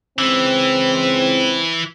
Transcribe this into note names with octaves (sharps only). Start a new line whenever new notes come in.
C#2 C#3 E3 C4